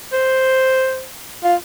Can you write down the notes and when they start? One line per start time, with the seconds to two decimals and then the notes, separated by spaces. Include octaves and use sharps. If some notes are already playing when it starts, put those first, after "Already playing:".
0.13 C5
1.44 F4